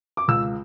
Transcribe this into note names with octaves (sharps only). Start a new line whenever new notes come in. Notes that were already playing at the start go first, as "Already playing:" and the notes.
D6
C#2 E6